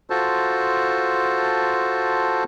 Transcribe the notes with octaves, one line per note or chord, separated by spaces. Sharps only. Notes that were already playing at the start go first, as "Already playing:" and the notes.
F4 F#4 A4 C5 A5